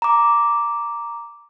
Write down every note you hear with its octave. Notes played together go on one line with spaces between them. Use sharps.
A#5 D6